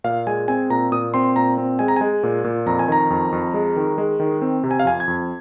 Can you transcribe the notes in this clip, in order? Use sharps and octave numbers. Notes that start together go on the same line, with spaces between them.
A#2 F5
G#3 G#5
C4 G#5
A#2 A#5
A#2 D#6
C4 C6
A#2 A#5
C4
G#3 G#5
A#5
G#3 G#5
A#2
A#2
F2 A#5
G#5
D#3 A#5
F2
F2
G#3
D#3
G#3
D#3
C4
C3
G#5
F5
F2 G#5
G#6
F2